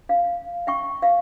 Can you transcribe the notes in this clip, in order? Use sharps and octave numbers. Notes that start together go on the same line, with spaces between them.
F5
E5 G5 C#6
E5 F5